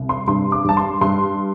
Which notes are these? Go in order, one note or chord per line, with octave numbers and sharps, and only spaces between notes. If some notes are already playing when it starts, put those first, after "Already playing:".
Already playing: C2
C6
G2 C6
D6
G2 A5
C6
G2 C6